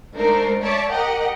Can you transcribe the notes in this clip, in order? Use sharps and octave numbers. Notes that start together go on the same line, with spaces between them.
G#3 A3 D4 D#4 A#4 C5
C#5 D5 E5 A5
G4 A#4 D#5 F#5